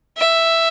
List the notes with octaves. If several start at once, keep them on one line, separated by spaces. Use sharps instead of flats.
E5